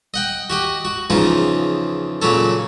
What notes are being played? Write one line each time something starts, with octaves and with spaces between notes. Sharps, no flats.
D#5 F#5 G5
F#4 G4 D#5
F#4
E2 C#3 F3 D#4
A#2 C#3 F#3 C#4 A4